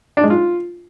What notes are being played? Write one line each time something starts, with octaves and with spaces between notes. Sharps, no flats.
D4
G#3
F4